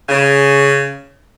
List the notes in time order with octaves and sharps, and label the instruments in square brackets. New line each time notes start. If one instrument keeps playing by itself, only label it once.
[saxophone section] C#3